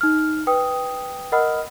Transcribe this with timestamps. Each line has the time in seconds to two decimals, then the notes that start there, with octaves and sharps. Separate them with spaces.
0.01 D#4 F6
0.47 B4 G5 D#6
1.32 A#4 D#5 F#5 B5 D#6 F6